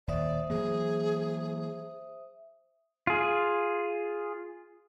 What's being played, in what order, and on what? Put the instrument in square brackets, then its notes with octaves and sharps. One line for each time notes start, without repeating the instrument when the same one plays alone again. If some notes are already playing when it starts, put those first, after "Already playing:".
[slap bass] D#1 D#2 [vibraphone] C5 E5 D#6 [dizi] D5
[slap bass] E3 F#3 A#3 [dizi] G#4
[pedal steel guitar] F4 G#4